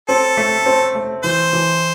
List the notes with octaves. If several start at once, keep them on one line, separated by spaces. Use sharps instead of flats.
C4 A4
A3
C4
A3
E3 C5
E3